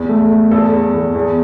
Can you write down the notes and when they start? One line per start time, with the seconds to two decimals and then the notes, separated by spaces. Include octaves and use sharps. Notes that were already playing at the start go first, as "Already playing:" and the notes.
Already playing: E2
0.09 A3
0.30 A3
0.51 E2 A4
0.73 E2
0.94 E2
1.15 E2